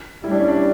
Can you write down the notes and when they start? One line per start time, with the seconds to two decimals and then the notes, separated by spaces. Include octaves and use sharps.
0.23 G3 E4
0.31 D4
0.40 C#4
0.48 D4